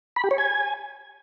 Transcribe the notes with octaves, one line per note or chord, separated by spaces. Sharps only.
B5
G4
C#5
G#5